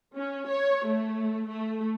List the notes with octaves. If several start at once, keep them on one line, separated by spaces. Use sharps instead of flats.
C#4
C#5
A3
A3